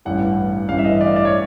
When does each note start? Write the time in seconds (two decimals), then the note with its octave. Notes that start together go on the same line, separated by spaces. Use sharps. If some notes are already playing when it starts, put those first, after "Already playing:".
0.05 A1 G2 E3 F#5
0.68 A1 G2 E3 F5
0.79 E5
0.85 D#5
1.01 D5
1.16 D5
1.25 C#5